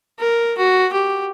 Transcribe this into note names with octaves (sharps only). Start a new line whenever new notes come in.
A#4
F#4
G4